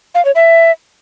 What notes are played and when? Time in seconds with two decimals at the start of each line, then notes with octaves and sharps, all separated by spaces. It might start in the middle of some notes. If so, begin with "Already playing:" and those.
0.15 F5
0.25 C#5
0.35 E5